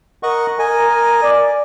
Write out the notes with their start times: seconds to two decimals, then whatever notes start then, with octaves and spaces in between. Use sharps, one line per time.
0.23 A#4 D#5 F#5 C#6
0.59 A#4 D#5 G#5
1.22 D5